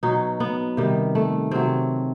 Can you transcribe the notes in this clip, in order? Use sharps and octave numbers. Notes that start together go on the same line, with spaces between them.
B2 F#3 D#4
B3
C3 D#3 G3
A3
C3 F#3 C4